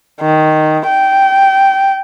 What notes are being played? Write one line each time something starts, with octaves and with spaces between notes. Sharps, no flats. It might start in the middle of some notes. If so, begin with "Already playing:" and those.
D#3
G5